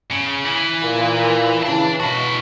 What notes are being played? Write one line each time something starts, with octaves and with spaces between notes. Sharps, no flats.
C#3
E3
A#2 A#3
C#3 E3 D4 A5
B2 E4 F#4